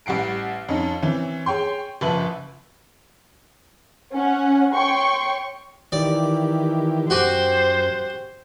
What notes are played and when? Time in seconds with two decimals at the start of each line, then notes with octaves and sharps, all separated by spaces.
0.06 A1 G3 F#5 C7 D7
0.69 F2 C#4 D#4
1.03 E3 C4 C#4
1.46 G#4 C#5 G5 C6
2.01 F#1 F3 B4 E5 F#7
4.12 C#4 F#5
4.73 C#5 G5 C6 C#6
5.92 D#3 E3 G4 D5
7.10 F#2 F#4 G4 C5 G#5